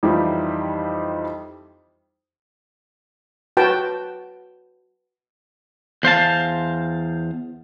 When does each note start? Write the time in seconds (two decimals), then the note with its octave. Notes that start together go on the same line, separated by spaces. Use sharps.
0.03 F2 E3 G3 D#4 F4 G4
3.57 F#4 B4 G5 A5
6.03 E2 C5 F5 A5